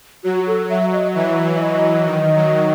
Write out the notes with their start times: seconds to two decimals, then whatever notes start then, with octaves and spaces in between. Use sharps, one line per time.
0.24 F#3 F#4
0.47 A4
0.70 F#3 E5
0.93 D#5
1.15 E3 E5
1.45 E3
1.55 E5
1.60 D#5
1.75 E3
2.06 D#3
2.36 F#3